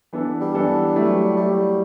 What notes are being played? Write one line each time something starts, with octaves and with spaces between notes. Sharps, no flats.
E3 B3 D4 A4
G3
E3 B3 D4 A4
F#3 A3 E4
F#3 G3 A3 E4